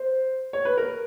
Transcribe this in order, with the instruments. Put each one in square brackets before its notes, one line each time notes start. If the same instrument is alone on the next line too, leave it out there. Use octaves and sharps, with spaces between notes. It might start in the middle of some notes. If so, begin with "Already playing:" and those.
Already playing: [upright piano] C5
C#5
B4
A#4